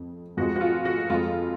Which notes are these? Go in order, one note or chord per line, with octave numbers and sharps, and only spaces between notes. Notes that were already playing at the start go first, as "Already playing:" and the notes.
Already playing: F2
F2 F3 G#3 F#4
F#4
F4
F#4
F2 F3 G#3 F4